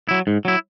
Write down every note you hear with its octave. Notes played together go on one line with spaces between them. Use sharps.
F#3 E4
G#2
F#3 E4